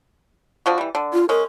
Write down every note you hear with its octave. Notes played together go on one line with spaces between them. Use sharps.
D3 F3 F#4
E3 G3
D3
F4
G#3 C#4 A#4